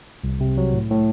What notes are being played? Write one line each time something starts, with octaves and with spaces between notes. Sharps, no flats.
C2
C3
F#3
A2
A2